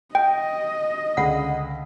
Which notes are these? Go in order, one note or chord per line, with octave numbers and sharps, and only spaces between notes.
D#5 G5
C#2 D3 F#5 B5